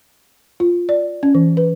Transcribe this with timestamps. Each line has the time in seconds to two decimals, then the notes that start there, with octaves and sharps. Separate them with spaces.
0.60 F4
0.89 D5
1.23 C#4
1.35 E3
1.57 B4